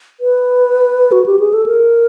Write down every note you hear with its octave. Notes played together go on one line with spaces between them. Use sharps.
B4
F#4
G4
G#4
A4
A#4